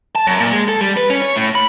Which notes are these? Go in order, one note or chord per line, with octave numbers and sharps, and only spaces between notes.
A5
F#2
A#2
G#3
A4
G3
B4
C#4
C#5
A2
B5